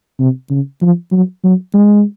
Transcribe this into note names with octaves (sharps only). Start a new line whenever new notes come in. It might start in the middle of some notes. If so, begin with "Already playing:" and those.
C3
C#3
F3
F#3
F#3
G#3